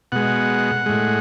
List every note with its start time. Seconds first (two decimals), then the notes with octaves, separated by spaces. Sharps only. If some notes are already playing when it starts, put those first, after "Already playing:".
0.12 B2 G#3 F#5
0.86 A2 G#3